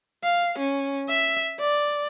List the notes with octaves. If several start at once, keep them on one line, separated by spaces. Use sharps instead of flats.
F5
C#4
E5
D5